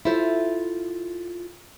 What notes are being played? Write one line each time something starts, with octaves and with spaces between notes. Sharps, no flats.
E4 F4 A4 C5